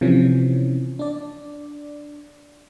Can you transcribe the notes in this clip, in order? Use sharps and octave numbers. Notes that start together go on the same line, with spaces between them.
C3 E3 F3 C#4
D4 D5